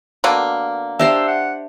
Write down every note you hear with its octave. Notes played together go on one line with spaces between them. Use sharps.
B2 D3 A#3
D4 G4 C5 E5 E6
F#5